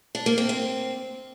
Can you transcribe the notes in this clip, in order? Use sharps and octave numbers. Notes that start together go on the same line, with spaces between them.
D4
A#3
C4
C4